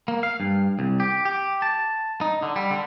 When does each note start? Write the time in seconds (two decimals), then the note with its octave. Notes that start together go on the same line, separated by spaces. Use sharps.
0.08 A#3
0.23 F5
0.40 G2
0.79 C2
1.00 G4
1.25 G4
1.62 A5
2.21 D#4
2.43 D3
2.56 G3
2.71 D3